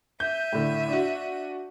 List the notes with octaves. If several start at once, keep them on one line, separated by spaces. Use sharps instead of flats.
E5 G6 D#7
A2 D3
D4 F#4